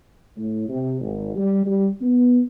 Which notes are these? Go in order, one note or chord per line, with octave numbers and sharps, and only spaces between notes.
A2
C3
G#1
G3
G3
B3